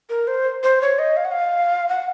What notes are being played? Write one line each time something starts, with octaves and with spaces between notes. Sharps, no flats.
A#4
C5
C5
C#5
D#5
F5
F#5
F5
F#5